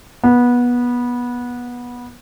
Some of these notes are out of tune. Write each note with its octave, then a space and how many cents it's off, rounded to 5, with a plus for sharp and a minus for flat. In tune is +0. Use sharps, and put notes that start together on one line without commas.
B3 -20